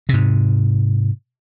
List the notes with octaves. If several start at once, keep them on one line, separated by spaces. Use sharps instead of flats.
G#2 C3